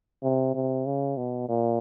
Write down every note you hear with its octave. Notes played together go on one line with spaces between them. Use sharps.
C3
C3
C#3
B2
A#2